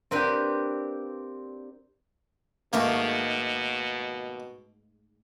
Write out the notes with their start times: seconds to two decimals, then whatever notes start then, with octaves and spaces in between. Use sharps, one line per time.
0.11 A#3 C4 D4 G4 A#4 B4
2.73 G#2 B2 D#3 A3 A#3 D#4